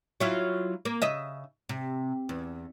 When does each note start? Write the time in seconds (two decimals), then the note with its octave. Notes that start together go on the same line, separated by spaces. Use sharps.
0.20 F#3 E4 F4
0.85 A#3
1.02 C#3 D#5 E5
1.69 C3
2.29 E2